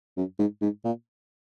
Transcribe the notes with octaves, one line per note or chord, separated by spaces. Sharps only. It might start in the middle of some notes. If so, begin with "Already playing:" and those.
F#2
G#2
G#2
A#2